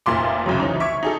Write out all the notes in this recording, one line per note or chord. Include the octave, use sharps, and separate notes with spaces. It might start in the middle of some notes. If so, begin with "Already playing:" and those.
F1 A#2 F4 E5 C6 D6
C2 F2 C#3 F#3
E3 F3 C#4 D#4
E5 C#6 D6 G#6
D#4 G#4 A4